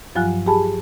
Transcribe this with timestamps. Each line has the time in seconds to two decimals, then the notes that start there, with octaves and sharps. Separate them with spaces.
0.15 G2 F3 F#3 F4 G#5 F#6
0.46 G4 G#4 G#5 A5 B5